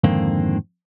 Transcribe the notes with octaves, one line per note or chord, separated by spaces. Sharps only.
F2 G#2 D3 D#3 A#3 C4